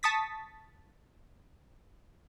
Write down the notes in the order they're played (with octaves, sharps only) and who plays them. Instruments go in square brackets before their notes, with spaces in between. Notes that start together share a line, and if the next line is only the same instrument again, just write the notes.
[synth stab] A5 C#6 D#6 A6 B6